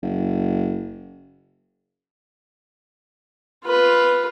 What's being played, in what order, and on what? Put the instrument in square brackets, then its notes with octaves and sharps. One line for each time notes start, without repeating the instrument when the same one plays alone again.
[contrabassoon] F#1
[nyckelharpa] F4 B4